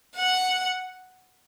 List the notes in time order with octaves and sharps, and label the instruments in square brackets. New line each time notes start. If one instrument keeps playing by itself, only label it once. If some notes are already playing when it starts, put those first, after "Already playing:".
[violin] F#5